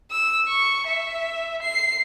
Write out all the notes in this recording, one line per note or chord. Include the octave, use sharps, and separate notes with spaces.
E6
C#6
E5
C7